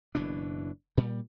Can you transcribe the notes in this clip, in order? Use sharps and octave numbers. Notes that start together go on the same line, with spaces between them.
F#1 B2 E3 D4
A#2 G3